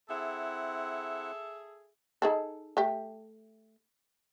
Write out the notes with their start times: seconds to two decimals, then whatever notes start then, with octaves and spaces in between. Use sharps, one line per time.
0.09 C4 E4 G#4 A4 E5 F#5
2.22 D#4 G#4 A4
2.77 A3 G4